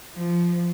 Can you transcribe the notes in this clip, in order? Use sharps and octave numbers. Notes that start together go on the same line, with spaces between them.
F3